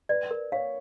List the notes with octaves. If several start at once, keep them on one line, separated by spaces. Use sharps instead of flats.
B4 D5
A#4
C#5 F5